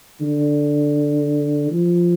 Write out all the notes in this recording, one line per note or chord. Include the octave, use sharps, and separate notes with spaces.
D3
F3